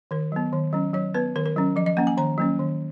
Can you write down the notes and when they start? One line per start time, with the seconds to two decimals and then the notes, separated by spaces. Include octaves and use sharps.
0.11 D#3 A#4
0.32 F#3 B3
0.53 D#3
0.73 F#3 C#4
0.93 F#3 C#5
1.14 B3 B4
1.35 D#3 A#4
1.46 A#4
1.56 F#3 C#4
1.76 F3 D#5
1.86 D#5
1.97 A#3 C#4 F#5
2.07 G#5
2.18 D#3 A#5
2.38 F#3 A#3 C#4
2.59 D#3